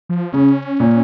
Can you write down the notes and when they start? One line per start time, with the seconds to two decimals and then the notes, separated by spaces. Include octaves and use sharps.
0.09 F3
0.33 C#3 C#4
0.80 A#2